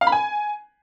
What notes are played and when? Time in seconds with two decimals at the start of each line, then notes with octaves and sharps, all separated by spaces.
0.01 F5
0.07 B5
0.12 G#5